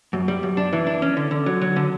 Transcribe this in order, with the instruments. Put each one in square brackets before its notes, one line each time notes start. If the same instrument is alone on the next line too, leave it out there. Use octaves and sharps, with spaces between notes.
[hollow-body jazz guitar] F#2
G3
F#2
D4
E3
D4
C#4
D3
D3
F#3
F#3
D3